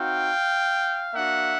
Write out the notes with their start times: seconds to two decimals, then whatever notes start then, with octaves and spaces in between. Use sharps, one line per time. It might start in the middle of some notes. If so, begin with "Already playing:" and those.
Already playing: C4 D#4 F#4 F5 G5
1.13 A#3 D4 F#4 E5 F#5